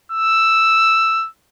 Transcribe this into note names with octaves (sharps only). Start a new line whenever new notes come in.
E6